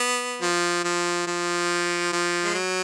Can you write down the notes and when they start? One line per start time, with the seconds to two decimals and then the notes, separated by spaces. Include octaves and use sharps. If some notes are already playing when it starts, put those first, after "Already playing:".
Already playing: B3
0.42 F3
0.84 F3
1.27 F3
2.13 F3
2.44 G#3
2.55 F#3